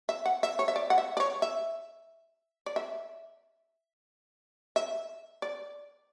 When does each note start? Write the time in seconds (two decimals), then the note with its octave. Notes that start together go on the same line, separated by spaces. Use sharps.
0.09 E5
0.26 F#5
0.43 E5
0.59 C#5
0.68 E5
0.76 D5
0.90 F#5
0.98 E5
1.17 D5
1.20 C#5
1.42 E5
2.66 D5
2.76 E5
4.76 E5
5.42 D5